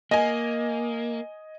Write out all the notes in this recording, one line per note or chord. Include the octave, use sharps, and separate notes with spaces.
A#3 D#5 G#5